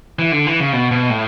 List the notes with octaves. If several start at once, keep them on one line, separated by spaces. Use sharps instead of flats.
E3
D3
E3
C#3
B2
B2
A2